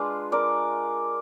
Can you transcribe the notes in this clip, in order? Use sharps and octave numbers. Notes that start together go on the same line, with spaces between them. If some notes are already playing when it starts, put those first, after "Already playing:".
Already playing: G#3 D4 F4 G#4 B4
A#4 D5